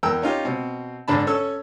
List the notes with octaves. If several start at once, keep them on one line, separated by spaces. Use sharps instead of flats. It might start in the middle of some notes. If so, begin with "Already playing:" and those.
E2 A#4 G5 E6
C#4 D#4 F4 G4
B2 C4
G#1 G#2 D3 D4 A5 B5
C#4 A4 C#5 E6